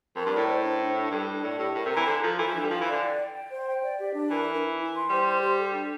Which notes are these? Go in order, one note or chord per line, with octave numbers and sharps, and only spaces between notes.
F2 A#4
G2
D5
A2
C5
D4
D4
D4
G2 A4
D4
A2 D5
A2 G4
A2 A#4
C3
A#5
E3
D3 A4
F3 A4
E3 A4
F3
E3 D4
G3
F3 F5
E3
D5
D3
G5
G5
G5
C5
G5
D5
G4
D4
E3 A#4
A#4
E4
E4
C6
G3 C5
C6
G4
A4
D4